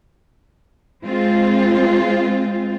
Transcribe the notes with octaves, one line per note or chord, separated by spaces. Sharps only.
G#3 C4 F4